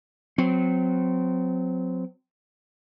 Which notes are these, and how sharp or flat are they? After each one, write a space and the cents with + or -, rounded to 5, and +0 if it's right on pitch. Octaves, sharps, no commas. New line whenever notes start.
F#3 -30 C4 -25